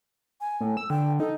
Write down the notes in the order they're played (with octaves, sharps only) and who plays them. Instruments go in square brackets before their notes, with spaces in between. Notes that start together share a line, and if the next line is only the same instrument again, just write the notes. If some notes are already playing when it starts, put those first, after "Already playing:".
[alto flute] G#5
[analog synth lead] A2
E6
[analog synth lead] D3 [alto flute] G5
[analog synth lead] D#4 [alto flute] A4